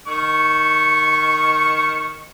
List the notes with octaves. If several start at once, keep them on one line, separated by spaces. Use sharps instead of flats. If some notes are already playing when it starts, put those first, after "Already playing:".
D#3 C#6